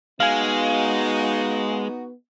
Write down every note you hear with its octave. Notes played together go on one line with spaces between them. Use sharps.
G#3 B3 D#4 F#4 F5 G#5